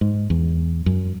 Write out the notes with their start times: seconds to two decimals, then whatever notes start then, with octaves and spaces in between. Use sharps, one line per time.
0.01 G#2
0.30 E2
0.86 F#2